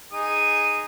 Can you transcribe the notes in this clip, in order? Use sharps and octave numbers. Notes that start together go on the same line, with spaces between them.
D#4 G#4 D#6